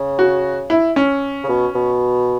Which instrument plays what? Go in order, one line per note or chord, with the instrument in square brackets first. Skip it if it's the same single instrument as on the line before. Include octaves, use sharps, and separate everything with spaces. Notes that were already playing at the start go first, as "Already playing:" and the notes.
Already playing: [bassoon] C#3
[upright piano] F#4
E4
C#4
[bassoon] C#3
B2
B2